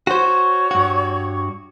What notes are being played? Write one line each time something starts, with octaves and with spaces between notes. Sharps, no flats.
F#4 C5 C#5
G2 F#4